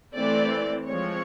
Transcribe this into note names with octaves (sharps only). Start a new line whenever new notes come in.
E3 A3 C4 D5
F3 G#3 C4 C#5